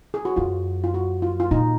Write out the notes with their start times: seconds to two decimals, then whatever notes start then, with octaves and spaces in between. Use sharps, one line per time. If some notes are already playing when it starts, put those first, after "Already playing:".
0.14 G#4
0.25 F#4
0.36 F#2 F4
0.84 F4
0.94 F#4
1.22 F4
1.40 F4
1.51 A#2 D#4